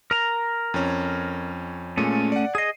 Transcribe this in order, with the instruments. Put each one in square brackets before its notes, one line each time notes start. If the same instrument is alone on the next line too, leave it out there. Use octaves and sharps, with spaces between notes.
[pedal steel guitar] A#4 A#5
[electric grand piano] F2 C#4
[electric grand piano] A#2 G#3 [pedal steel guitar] A3 C#4
[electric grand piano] D5 F#5
[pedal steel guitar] G#4 D#5 [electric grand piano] C7 D#7